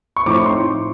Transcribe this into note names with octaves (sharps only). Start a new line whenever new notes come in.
C#6
A2 F3 A3 C4 D#4 D6
C#6
C6